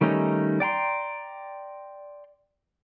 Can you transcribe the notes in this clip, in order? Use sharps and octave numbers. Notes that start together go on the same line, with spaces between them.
D#3 G3 A3 C#4 D#4
D5 G5 A#5 C6